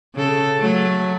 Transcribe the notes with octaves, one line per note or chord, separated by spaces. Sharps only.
C#3 A4
F#3 A3